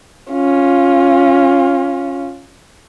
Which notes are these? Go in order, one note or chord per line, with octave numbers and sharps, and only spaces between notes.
C#4 F4